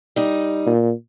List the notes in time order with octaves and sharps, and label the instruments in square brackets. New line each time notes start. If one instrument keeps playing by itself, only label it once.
[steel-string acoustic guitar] G3 D#4
[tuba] A#2